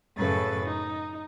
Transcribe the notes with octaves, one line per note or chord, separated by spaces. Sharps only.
F#2 A2 C#3 A4 B4 A6
D#4